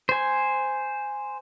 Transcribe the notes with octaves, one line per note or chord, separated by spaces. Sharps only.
C5 G#5